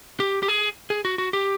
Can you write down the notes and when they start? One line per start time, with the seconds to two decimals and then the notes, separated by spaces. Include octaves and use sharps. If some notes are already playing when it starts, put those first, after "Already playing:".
0.20 G4
0.43 G4
0.48 G#4
0.90 G#4
1.05 F#4
1.18 F#4
1.33 G4